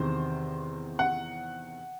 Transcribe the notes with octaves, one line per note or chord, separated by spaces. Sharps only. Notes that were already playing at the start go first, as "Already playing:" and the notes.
Already playing: E2 C3 D#3 C5
F#5